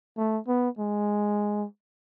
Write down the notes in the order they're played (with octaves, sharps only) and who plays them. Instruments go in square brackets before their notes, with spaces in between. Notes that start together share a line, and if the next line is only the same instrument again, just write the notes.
[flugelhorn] A3
B3
G#3